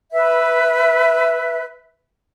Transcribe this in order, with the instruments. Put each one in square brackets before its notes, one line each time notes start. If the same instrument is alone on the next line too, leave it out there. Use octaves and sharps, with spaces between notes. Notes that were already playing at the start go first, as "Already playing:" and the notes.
[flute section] B4 E5